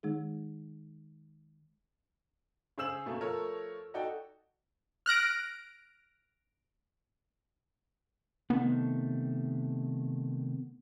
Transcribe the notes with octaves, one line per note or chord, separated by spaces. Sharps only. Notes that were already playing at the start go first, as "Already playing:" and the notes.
D#3 G#3 D#4 G#4
C#3 G#4 C5 E6 E7 F#7
B2 A3 A#3
F3 A3 A#4 C#5
D#4 F#4 A4 D5 G5
F6 F#6 A#6 D7
C3 D#3 A3 B3